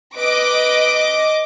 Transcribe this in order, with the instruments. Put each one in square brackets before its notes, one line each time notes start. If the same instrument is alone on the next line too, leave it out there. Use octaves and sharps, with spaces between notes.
[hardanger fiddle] B4 [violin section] D#5 D6